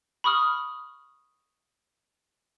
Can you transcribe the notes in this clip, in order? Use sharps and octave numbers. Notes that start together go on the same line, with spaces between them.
B5 C#6 D#6 F6